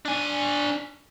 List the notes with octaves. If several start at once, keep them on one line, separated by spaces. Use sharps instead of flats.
D4 G#5